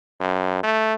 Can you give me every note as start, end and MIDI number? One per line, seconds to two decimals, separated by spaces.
0.20 0.62 42
0.63 0.94 57